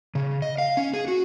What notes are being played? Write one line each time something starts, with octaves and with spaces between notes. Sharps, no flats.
C#3
D#5
F5
C#4
G#4
F#4